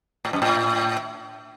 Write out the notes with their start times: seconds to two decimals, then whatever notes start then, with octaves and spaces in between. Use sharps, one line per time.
0.25 A2
0.33 F#2
0.42 A2